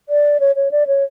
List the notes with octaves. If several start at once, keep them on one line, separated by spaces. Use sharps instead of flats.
D5
C#5
C#5
D5
C#5